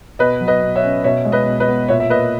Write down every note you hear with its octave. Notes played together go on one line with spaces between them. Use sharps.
B2 B4 D#5
F#3
B4 D#5
B2
C#5 E5
C#4
B2 C#5 E5
G#3
B4 D#5
B2
B4 D#5
B3
A#2 C#5 E5
E5
A#3 B4 D#5